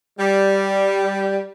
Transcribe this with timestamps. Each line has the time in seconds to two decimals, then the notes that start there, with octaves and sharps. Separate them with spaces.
0.19 G3